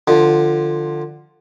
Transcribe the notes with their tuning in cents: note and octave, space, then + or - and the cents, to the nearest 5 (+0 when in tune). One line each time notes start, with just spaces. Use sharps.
D3 +20 F3 +0